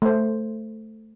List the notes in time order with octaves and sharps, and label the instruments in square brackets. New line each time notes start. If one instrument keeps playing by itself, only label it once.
[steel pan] A3 C5